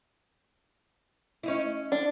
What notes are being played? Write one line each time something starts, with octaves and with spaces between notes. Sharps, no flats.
C#4 D#4 E4
D4